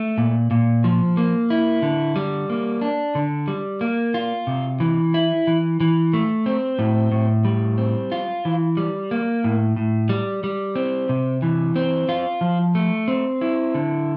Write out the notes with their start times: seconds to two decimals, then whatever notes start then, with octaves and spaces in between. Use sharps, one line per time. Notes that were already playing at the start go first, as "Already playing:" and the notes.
Already playing: A3
0.18 A#2
0.51 A#2
0.84 F3
1.17 A#3
1.50 E4
1.82 D3
2.16 G3
2.50 A#3
2.81 D4
3.15 D3
3.48 G3
3.81 A#3
4.14 F4
4.47 C3
4.80 E3
5.14 E4
5.47 E3
5.80 E3
6.14 A3
6.46 C4
6.79 A2
7.12 A2
7.45 G3
7.78 C4
8.12 F4
8.45 E3
8.77 G3
9.11 A#3
9.44 A2
9.76 A2
10.09 G3
10.44 G3
10.76 C4
11.09 C3
11.42 E3
11.76 C4
12.09 F4
12.41 F3
12.75 A3
13.08 C4
13.41 E4
13.74 D3